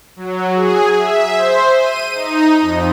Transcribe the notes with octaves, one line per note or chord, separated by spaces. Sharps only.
F#3
G#4
E5
C5
D#7
D#4
F2